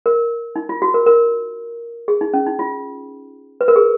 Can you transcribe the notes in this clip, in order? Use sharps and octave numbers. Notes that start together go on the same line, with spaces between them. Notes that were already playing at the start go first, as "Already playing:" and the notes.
A#4
D#4
F4
F#4
A#4
A#4
G#4
D#4
C#4
D#4
F4
B4
A#4
G#4